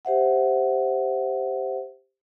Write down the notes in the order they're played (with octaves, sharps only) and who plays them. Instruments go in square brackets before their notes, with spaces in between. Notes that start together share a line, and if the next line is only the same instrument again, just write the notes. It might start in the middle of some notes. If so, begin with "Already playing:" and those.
[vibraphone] G4 C5 E5 F#5